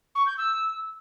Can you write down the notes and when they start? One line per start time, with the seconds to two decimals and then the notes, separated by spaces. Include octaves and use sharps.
0.15 C#6
0.26 G6
0.37 E6